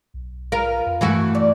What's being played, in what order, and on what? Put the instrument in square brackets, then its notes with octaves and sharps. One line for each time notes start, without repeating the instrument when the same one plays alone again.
[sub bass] B1
[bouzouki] F4 B4 F5 [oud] A#4
[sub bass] F2
[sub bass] G2 [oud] E3 A3 F#4
[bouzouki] A#2 D5